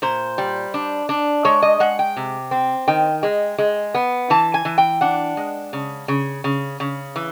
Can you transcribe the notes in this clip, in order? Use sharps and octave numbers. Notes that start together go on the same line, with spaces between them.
A#2 C5
G3
D4
D4
G#3 C#5
D#5
G#3 F#5
G5
C3
C4
D#3 G5
G#3
G#3
B3
E3 A5
G#5
E3
G5
D4 F#5
G#3
C#3
C#3
C#3
C#3
E3